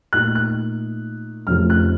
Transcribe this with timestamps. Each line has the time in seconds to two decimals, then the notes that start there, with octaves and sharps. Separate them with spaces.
0.13 A#2 A3 D#4 F#6
0.35 F#6
1.47 F1 F2 C#3 F3 A3 F6
1.70 F#6